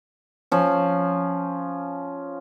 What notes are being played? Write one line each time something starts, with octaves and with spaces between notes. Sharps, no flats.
F3 C#4